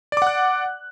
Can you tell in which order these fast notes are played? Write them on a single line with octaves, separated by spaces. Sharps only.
D5 D6 F#5 F#6